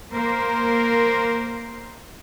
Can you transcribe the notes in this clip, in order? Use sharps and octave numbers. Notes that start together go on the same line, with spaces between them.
A#3 A#4 C5